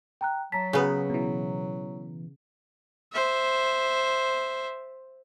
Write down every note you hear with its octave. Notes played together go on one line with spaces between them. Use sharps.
G5 A#5 F#6
F#3 A5 A#5 B6
C#3 B3 F#4 G#4 B4
B2 E3
C5 E5